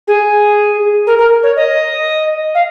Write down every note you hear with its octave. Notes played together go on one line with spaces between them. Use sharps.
G#4
A#4
A#4
C#5
D#5
F5